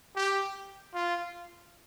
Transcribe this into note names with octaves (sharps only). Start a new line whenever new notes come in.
G4
F4